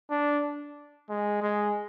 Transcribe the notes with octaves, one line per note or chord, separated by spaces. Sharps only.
D4
G#3
G#3